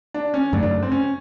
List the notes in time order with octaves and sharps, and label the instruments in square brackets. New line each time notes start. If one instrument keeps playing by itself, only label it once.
[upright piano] D4
C#4
[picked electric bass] F#2 C#3 F#3 A3 [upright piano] D4
[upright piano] D4
C4
C#4